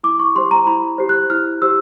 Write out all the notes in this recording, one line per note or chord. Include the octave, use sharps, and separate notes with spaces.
E4 D6
C#6
G4 C5 C6
A#5
E4 B5
G4 C5
F#6
E4 F6
G4 C5 E6